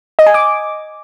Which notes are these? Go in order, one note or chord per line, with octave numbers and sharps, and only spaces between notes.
D#5
G#5
D6